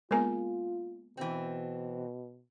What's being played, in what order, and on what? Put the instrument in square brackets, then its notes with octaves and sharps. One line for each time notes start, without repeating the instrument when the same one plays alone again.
[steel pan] G#3 A#4 [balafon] A#3 B3 G#5 [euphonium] F4
[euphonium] B2 [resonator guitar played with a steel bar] E3 C4